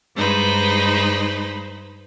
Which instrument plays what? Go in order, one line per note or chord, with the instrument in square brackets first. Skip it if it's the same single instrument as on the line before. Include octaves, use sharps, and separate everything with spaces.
[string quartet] G2 G#3 D#4 B4 C5